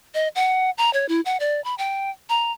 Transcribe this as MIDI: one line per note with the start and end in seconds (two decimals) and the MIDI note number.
0.14 0.28 75
0.35 0.70 78
0.78 0.92 82
0.93 1.06 73
1.09 1.21 64
1.25 1.37 78
1.40 1.63 74
1.64 1.75 83
1.78 2.10 79
2.29 2.52 82